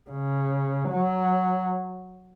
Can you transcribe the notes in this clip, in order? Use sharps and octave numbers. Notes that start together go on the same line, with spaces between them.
C#3
F#3